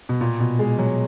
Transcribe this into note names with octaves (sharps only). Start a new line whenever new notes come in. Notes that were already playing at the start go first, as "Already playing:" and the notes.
B2
A#2
B2
G#3
F#3